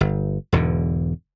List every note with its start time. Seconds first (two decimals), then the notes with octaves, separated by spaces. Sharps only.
0.01 G1
0.52 E1 E2 G#2 D3